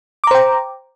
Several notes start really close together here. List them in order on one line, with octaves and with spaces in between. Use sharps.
D6 A#5 C5 G5